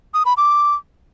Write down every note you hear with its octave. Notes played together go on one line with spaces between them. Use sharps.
D#6
B5
D6